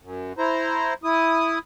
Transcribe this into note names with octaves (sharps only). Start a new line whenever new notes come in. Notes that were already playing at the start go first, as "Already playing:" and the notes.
F#2
E4 C5 A#5
E4 D#6